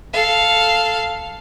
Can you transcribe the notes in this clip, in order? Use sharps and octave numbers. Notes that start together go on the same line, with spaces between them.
A4 F5